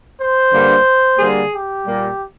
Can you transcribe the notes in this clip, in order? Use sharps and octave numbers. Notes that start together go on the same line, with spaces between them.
C5
G2 D3 G3 A#3
D3 G3 A#3 G#4
G4
A#2 G3 A#3